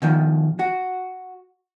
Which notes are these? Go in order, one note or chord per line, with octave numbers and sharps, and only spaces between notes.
B2 D#3 F3
F#4